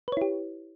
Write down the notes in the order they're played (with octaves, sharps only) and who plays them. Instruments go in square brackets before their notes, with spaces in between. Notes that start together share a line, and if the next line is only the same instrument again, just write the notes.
[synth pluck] B4
C#5
E4
G4